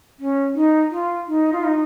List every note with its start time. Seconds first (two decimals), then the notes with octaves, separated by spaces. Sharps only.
0.19 C#4
0.55 D#4
0.91 F4
1.28 D#4
1.53 F4
1.64 D#4